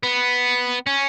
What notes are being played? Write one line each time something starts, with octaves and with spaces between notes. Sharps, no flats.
B3
C#4